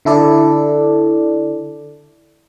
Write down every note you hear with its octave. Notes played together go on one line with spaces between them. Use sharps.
D3 E4 A4 D5